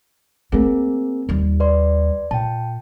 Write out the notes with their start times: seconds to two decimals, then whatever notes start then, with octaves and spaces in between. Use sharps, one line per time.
0.52 A3 A#3 C4 G#4 A#4
1.29 D#2 G3
1.60 B4 D5 C6
2.31 A#2 G5 A5